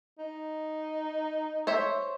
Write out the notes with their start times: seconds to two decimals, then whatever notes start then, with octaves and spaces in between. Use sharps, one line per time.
0.19 D#4
1.67 C5 C#5 E5